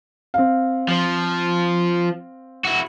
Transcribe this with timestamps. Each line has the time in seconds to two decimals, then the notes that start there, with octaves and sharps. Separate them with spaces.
0.34 C4 F5
0.88 F3
2.65 E4 F#4